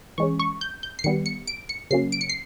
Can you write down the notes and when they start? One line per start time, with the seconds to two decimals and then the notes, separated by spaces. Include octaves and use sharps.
0.18 E3 G#3 C#4 C#6
0.39 C#6
0.61 G6
0.83 G6
0.99 C7
1.04 D#3 G3 B3 C#7
1.26 C#7
1.47 D7
1.69 C#7
1.91 C#3 F#3 A#3 C#4 C7
2.12 D7
2.21 C#7
2.29 C7